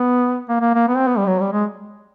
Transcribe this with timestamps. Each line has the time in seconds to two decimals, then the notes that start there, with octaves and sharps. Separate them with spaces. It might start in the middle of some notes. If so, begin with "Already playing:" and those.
Already playing: B3
0.49 A#3
0.61 A#3
0.75 A#3
0.88 B3
0.97 C4
1.07 B3
1.18 G3
1.26 F#3
1.41 G3
1.52 G#3